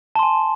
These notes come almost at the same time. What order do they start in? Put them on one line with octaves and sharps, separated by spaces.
A5 C6 G#5